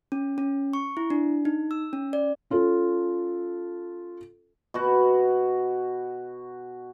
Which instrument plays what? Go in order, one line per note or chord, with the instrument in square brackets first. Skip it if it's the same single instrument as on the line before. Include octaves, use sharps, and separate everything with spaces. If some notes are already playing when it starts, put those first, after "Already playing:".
[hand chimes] C#4
C#4
C#6
E4
D4
D#4
E6
C#4
D5
[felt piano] C#4 F4 A4
[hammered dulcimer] B2 F#4